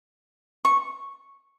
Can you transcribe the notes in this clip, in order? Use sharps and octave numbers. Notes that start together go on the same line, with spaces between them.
C#6